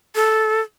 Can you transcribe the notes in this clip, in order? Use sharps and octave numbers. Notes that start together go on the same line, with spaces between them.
A4